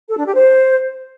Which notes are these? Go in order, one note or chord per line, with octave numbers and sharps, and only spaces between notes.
A4
D4
G4
C5